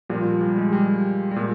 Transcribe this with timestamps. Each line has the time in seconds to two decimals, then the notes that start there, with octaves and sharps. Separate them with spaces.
0.09 A#2 F3 G3
0.41 G3
0.58 G#3
0.73 G3
1.31 G3
1.36 A#2 G#3